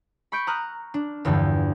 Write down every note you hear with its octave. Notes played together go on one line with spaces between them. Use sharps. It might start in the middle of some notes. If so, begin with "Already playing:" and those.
B5 C#6 G6 C#7 D7
A#5 D#6 F6 F#6
D4
E2 G2 D3 F3 G5